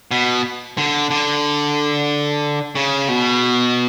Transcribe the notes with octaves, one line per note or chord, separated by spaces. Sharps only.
B2
D3
D3
C#3
B2